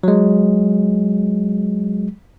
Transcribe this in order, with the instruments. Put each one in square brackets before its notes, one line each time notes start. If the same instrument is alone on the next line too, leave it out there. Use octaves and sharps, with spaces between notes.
[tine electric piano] F#3 G#3